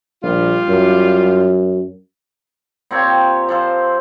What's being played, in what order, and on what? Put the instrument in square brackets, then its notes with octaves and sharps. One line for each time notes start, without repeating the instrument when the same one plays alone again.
[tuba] A#1 [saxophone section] G3 F4
[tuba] F#2
[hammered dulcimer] A#2 C4 G4 C#5
F3 A4 C5